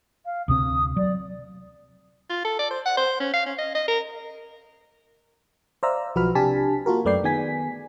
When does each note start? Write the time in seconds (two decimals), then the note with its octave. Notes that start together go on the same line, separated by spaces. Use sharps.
0.25 F5
0.48 D2 C3 C4 D#6
0.96 F#3 D5
2.30 F4
2.45 A4
2.59 D5
2.71 C5
2.86 F#5
2.97 C5
3.20 C#4
3.34 F5
3.46 C#4
3.58 D#5
3.75 D#5
3.88 A#4
5.83 C5 D5 E5 F5 A#5 E6
6.15 B1 F3 F#4 B4 B5 F6
6.35 C3 D4 G4 G#5 A5 B6
6.86 A#3 F4 F#4 A#4
7.05 F#2 A3 B4 D5 G5 C7
7.23 D#3 B3 G#4 G#5 B6